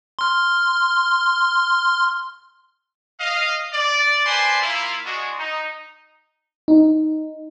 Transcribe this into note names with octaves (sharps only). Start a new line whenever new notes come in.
C6 F6
D#5 F5
D5
B4 C5 D5 G#5 A5 C6
A#3 E4 F4
G#3 D4 F#4
D#4
D#4